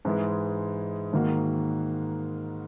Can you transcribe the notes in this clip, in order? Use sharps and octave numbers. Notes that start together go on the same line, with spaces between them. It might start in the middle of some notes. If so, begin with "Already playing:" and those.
G#2 E3 G#3
G#2 D#3 A#3 D#4 F#4